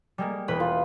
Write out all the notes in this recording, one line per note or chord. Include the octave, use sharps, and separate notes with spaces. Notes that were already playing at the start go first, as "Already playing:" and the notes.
G3 G#3 A#3
E1 B4 G5
F4